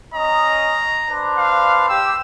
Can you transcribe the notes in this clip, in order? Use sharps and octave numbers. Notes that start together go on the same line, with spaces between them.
C#4 D#5 A#5
D4 B4 C5
F5
G4 E6